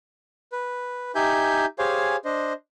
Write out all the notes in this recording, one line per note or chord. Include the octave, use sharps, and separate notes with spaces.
B4
D#4 G4 E5 G#5 G6
G4 G#4 C5 C#5 F5 G#5
D4 C5 D#5